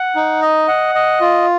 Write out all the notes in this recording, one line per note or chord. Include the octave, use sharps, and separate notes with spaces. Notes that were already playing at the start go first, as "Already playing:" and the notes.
Already playing: F#5
D#4
D#5
F#5
D#5
F4